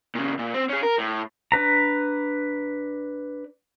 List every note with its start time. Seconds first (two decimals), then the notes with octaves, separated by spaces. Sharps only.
0.15 A#2 C#3
0.39 A#2
0.54 C4
0.69 C#4 G#4
0.83 A#4
0.98 A2
1.52 D4 B4 A#5